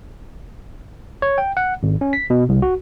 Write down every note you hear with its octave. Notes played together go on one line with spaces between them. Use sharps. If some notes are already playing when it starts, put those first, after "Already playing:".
C#5
G5
F#5
G#1
C#4
B6
B2
C2
F#4